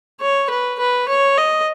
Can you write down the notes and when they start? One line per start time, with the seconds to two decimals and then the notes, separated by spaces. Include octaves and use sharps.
0.21 C#5
0.50 B4
0.79 B4
1.09 C#5
1.38 D#5